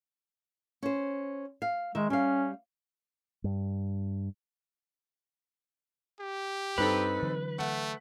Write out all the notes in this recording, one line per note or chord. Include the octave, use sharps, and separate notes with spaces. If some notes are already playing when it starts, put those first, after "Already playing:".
C#4 C5
F5
D#3 G#3 E5
G3 C#4 F5
G2
G4
G2 C4 D#4 A4 B4
D3 E3 F#3
A3 F#5